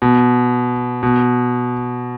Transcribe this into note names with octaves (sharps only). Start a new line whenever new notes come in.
B2
B2